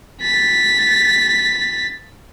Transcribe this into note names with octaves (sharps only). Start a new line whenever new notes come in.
A6 B6